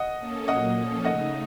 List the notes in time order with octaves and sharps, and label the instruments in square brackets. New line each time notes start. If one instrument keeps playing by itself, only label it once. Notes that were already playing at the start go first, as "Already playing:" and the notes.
Already playing: [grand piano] D#5 F#5
[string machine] A#3 C#4 A4
[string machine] A#2 F#3 A#3 [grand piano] D#5 F#5
[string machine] A#2 F3 A#3 C#4 A4
[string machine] C#3 A3 D#4 [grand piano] D#5 F#5